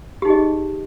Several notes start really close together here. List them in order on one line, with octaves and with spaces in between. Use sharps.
G4 D#4 G#4 D#5